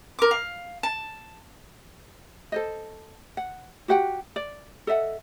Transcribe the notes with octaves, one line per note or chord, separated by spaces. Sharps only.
A#4 D6
F5
A5
A4 C5 D#5
F#5
F#4 G4 F#5 G5
D5
A4 D#5 E5 F#5